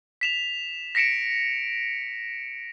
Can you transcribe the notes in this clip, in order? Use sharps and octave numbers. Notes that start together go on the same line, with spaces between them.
B6 E7 F7
A#6 B6 C#7 D7 E7